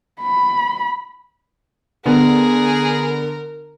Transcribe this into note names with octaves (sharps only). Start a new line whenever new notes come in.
B5
D3 B3 G#4 A#4